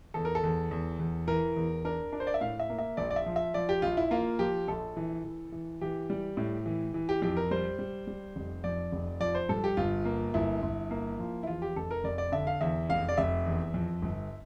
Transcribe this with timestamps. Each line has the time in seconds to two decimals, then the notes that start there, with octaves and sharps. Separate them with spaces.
0.14 E2 A4
0.25 A#4
0.35 A4
0.43 E2
0.71 E2
0.99 E2
1.28 E3 A#4
1.56 E2
1.85 D4 A#4
2.12 D4
2.20 C5
2.27 D5
2.34 E5
2.41 A2 F5
2.60 E5
2.70 A#3
2.78 E5
2.97 A#1 D5
3.11 D5
3.16 E5
3.26 F3
3.36 E5
3.54 F3 D5
3.69 G4
3.82 A#1 F4
3.97 E4
4.11 A#3 F4
4.39 F3 G4
4.68 A#1 A4
4.97 E3
5.24 E3
5.52 E3
5.81 E3 G4
6.10 G3
6.37 A2
6.66 E3
6.94 E3
7.09 G4
7.22 F2 G4
7.37 A#4
7.51 G3 C5
7.79 G3
8.07 G3
8.36 F1
8.64 F2 D5
8.92 F1
9.20 F3 D5
9.35 C5
9.49 G2 A4
9.64 G4
9.77 G1 F4
10.05 A#3
10.34 G1 E4
10.63 G1
10.91 A#3
11.19 F3
11.43 E4
11.47 E2 F4
11.62 G4
11.76 F1 A4
11.91 A#4
12.04 F1 D5
12.18 D5
12.32 D3 E5
12.47 F5
12.61 E2 E5
12.89 F1 F5
13.09 D5
13.18 F1 E5
13.46 E2
13.74 F2
14.02 G1